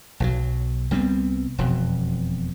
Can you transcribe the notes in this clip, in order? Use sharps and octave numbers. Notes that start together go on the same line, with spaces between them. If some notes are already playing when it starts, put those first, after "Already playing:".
B1 E3 F#3
C2 G3 B3 C4
E1 F2 B2